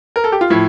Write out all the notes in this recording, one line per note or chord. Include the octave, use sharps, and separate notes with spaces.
A#4
A4
G4
F4
A2 F3 E4